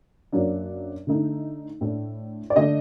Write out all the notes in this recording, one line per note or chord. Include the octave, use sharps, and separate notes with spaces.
F#2 F#3 A#3 D4
D3 A3 D#4
A2 A3 D4
D5
D3 A3 D4 D#5